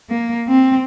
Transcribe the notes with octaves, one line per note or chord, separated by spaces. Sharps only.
A#3
C4